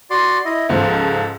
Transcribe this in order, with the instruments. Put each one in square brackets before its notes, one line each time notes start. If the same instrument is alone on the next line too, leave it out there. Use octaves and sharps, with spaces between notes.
[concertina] F#4 D5 C6
E4 D#5
[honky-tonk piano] C#2 G#2 F3 [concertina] A4